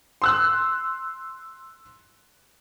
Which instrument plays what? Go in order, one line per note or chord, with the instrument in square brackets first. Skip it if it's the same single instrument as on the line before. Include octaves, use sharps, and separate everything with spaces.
[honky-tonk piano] C6 E6 F#6